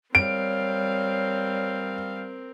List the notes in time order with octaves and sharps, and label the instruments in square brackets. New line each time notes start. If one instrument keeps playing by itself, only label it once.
[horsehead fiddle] G3 F5 [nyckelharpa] C4 A#4 [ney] C#5 [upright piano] D7